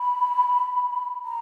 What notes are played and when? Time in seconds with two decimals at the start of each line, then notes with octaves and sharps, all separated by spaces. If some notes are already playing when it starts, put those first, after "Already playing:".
Already playing: B5
1.25 A#5